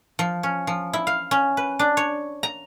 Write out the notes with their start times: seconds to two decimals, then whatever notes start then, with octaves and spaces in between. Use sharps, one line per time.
0.19 F3
0.43 C#4
0.67 F3
0.93 E4
1.07 F5
1.31 C#4
1.57 B4
1.79 D4
1.97 C#5
2.43 A#5